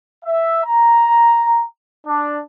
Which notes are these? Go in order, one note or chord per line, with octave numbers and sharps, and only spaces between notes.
E5
A#5
D4